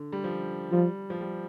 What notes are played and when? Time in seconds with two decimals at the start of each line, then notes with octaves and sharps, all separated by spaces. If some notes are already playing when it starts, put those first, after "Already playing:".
Already playing: D3
0.12 G3
0.24 F3
0.72 F3 G3
1.10 F3
1.21 G3